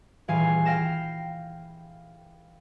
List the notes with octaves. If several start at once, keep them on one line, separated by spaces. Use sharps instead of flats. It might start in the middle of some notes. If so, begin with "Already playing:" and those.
D#1 E3 G#4 F5 G#5
F5 G5 F6 A#6 E7